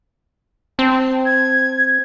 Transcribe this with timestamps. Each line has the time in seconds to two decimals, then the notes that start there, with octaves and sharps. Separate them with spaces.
0.79 C4 A5
1.25 G#6